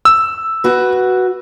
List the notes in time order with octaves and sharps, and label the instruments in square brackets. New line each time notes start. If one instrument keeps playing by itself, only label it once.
[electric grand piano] E6
[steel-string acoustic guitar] F#4 B4